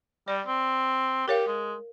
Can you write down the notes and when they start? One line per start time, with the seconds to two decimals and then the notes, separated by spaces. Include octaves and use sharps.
0.28 G3 D5
0.47 C4
1.28 G4 A#4 C#5 F5
1.47 G#3